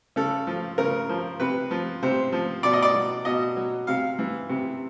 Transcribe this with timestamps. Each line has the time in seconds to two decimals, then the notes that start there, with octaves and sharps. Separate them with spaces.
0.16 C#3 A4
0.47 F3
0.78 C#3 A#4
1.09 F3
1.40 C3 B4
1.71 F3
2.03 C3 C5
2.32 F3
2.63 B2 D5
2.73 D#5
2.82 D5
2.94 F#3
3.25 B2 D#5
3.56 F#3
3.87 C3 F5
4.19 E3
4.49 C3